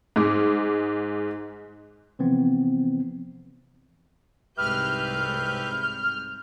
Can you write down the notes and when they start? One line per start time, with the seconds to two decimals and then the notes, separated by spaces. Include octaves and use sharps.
0.16 G#2 G#4 D6
2.19 C3 E3 F3 B3 C4
4.57 C2 G#2 G4 B4 E5 F6 G6